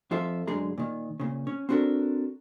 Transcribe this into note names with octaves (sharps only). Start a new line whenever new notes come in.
F2 F4 A4 E5
F#2 D3 G#3 G#4 A#5
A#2 D#3
A#2 C#3
C#4
C4 D4 F#4 A4 A#4